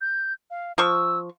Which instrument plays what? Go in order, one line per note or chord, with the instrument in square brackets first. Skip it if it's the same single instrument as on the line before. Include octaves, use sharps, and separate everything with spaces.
[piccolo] G6
F5
[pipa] F3 C#6 [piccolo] E6